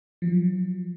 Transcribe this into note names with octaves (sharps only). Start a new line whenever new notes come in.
F3 F#3